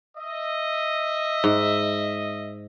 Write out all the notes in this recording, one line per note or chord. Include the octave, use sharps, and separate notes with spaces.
D#5 E5
G#2